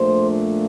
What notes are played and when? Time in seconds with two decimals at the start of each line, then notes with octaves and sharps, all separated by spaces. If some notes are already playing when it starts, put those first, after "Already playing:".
Already playing: A#2 F3 A3 D4 C5